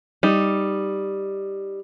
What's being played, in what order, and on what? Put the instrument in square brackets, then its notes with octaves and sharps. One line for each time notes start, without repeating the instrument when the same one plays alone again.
[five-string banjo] G3 D#4